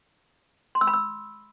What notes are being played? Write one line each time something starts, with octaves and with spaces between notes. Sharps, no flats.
C6
E6
B5
E6